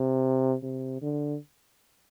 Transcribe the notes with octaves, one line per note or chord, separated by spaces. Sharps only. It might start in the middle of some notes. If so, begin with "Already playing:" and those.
Already playing: C3
C3
D3